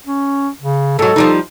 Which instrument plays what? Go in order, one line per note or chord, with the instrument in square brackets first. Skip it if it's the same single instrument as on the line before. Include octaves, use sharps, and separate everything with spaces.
[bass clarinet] C#4
C#3
[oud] G#2 F#3 [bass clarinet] A4
[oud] F3 G3 D#4